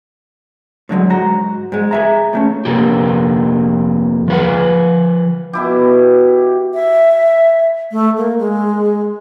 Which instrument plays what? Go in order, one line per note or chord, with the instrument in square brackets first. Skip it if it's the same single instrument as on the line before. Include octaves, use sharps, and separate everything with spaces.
[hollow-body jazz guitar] A2 D3 F#3 G#3
G#2 F#4 A#5
G#2 G#3
G#4 E5 A#5
A2 A3 C#4
[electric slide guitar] F2 C3 A#3 G4
F3 B4 F#5
[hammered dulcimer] B2 E4 G4
[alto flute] E5
A3
A#3
G#3